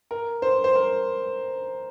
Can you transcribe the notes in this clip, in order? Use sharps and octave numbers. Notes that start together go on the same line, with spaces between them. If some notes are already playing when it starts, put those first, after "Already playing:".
A#4
C5
C5
A#4